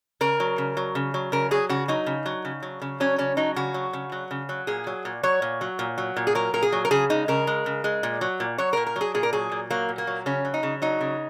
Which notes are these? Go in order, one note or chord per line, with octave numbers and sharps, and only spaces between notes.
C#3 A#4
F#3
C#3
F#3
C#3
F#3
C#3 A#4
F#3 G#4
C#3 F#4
F#3 D#4
C#3
F#3
C#3
F#3
C#3
F#3 C#4
C#3 C#4
F#3 D#4
C#3 F#4
F#3
C#3
F#3
C#3
F#3
A#2 G#4
F#3
A#2
F#3 C#5
A#2
F#3
A#2
F#3
A#2
G#4
F#3 A#4
A#2 A#4
G#4
F#3
A#4
C#3 G#4
G#3 D#4
C#3 A#4
G#3
C#3
G#3
A#2
F#3
A#2
F#3 C#5
A#2 A#4
A#4
F#3
G#4
A#2 G#4
A#4
F#3 G#4
A#2
F#3 A#3
A#2
A#3
F#3
C#3 C#4
F#3
D#4
C#3
F#3 D#4
C#3